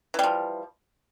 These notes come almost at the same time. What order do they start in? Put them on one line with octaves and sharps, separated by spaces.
E3 G3 F3